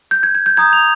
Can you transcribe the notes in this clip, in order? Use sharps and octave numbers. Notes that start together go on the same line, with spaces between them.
G6
G#6
G#6
G6
A#5 D#6 G6 G#6
F7